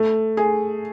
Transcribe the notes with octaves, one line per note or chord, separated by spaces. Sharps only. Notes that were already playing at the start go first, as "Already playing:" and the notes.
Already playing: A3
G#4